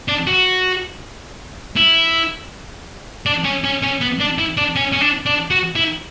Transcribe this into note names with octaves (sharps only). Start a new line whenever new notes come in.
D4
F#4
E4
D4
C#4
C#4
C#4
B3
D4
E4
D4
C#4
C#4
D4
D4
F#4
E4